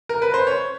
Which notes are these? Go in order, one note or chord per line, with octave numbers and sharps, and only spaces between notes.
A#4
B4
C5
C#5